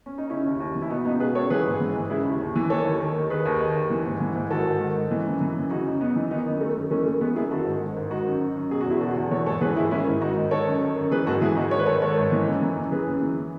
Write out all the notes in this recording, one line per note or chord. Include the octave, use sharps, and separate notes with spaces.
C#4
D#4
C#3 C#4 E4
D#2
D#2
E3
E4
B2 B3 D#4
C#2 B3 D#4
B2 G#4 B4
C#2 A4 C#5
E3 G#4 B4
G#2
E3
G#2
C#3 E4 G#4
D#2
D#2
E3
D#3 A4 C#5
D#2
D#3
D#2
D#3 G#4 B4
D#2
D#3
D#2
E3
G#2
E3
G#2
D#3 F#4 A4
G#2
D#3
G#2
E3
F#2
E3
F#2
C#3 D#4 F#4
F#2
F#2 B3 D#4
E3
D#3 B3 D#4
F#2
D#3 A3 C#4
F#2
E3 A3 C#4
F#2 A3
E3 G#3 B3
F#2 E4 G#4
D#3 F#4 A4
G#2
D#3
G#2
D#3 D#4 F#4
F#2
D#3
F#2
B2 G#4
F#4
E2 E4 G#4
B2 F#4 A4
E2
E3 A4 C#5
G#2 A4 C#5
E3 G#4 B4
G#2 E4 G#4
D#3 C#4 E4
G#2
D#3 D#4 F#4
G#2
D#3 A4 C#5
F#2
D#3
F#2
E3 G#4 B4
G#2 F#4 A4
E3 E4 G#4
G#2 D#4 F#4
D#3 C#5
B4
G#2 A4 C#5
D#3 A4 C#5
G#2
E3
F#2
E3
F#2
E3 G#4 B4
F#2
E3